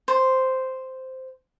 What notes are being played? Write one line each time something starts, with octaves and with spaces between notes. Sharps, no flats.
C5